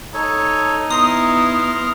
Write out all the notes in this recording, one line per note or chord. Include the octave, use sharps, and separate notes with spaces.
D#4 A4 C#5
B3 E4 A#5 C6 D#6 F6